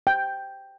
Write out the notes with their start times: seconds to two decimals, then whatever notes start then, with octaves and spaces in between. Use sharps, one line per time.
0.07 G5